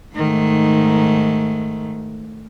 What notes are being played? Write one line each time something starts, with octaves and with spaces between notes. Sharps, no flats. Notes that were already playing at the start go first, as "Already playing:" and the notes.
G#2 D#3 A3